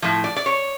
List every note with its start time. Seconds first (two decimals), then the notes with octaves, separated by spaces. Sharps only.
0.02 A2 F3
0.24 D5
0.36 D5
0.46 C#5